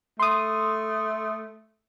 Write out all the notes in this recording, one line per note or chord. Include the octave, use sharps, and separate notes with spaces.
A3 C6 D#6